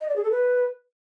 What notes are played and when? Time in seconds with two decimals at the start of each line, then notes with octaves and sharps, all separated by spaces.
0.01 D#5
0.08 D5
0.16 G#4
0.23 A4
0.31 B4